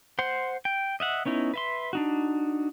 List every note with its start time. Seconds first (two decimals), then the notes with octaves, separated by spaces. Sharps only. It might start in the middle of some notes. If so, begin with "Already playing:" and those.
0.19 C5 F#5 C6
0.65 G5
1.00 D#5 E5 F#5
1.26 B3 C#4 D#4 E4
1.54 B4 E5 C6
1.93 D4 D#4 F#4